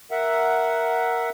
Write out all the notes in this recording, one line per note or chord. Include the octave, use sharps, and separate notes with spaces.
A#4 E5 F#5